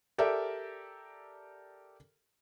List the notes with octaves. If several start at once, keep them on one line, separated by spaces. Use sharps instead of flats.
G4 A4 A#4 D5 E5